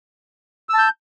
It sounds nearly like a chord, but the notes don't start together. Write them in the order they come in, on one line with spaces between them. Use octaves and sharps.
E6 A5 G6